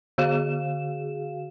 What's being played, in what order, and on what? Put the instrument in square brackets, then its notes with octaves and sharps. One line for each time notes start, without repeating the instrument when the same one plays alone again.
[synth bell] D3 F#4 G#4 F5 E7